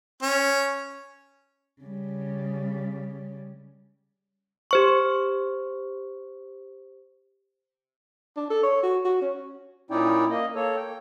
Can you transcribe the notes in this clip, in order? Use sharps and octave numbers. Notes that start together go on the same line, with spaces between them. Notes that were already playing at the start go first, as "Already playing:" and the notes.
C#4
C#3 G3
G4 C5 C#6
D4
A4
C#5
F#4
F#4
C#4
A#2 C#4 D#4 E4 D5 G5
A#3 D#5
A#3 A4 C#5
G5